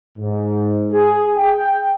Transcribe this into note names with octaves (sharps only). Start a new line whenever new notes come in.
G#2
G#4
G5